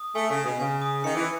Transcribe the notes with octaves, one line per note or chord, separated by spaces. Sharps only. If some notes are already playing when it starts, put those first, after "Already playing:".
Already playing: D#6
A3 G#5
C#3
G#5
B2
C#3 G#5
D#6
D#3 C#7
E3